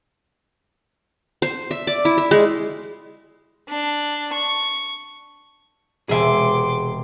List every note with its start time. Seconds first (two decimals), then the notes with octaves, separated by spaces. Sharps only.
1.42 C5
1.71 E5
1.87 D5
2.05 E4
2.18 E5
2.31 G#3
3.69 D4
4.33 C#6
6.09 E1 C3 G#4 E5 G#5 C6 D6